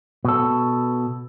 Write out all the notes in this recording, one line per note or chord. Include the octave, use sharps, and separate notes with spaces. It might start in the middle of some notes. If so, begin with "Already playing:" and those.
B2 A4